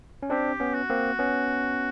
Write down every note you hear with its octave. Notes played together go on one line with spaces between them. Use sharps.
C#4
C4 D4 G4
B3 C#4
F#4
A#3 C4
B3 C#4